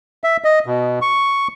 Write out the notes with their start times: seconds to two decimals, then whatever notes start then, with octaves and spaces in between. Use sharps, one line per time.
0.24 E5
0.44 D#5
0.66 B2
1.02 C#6